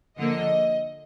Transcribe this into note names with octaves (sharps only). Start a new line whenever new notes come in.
D3 F3 A#3 D#5